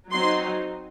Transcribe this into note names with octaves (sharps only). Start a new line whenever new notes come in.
F#3 C4 D#4 C6